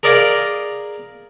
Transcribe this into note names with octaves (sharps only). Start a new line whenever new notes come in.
G#4 A#4 D5 D#5 F5 G#5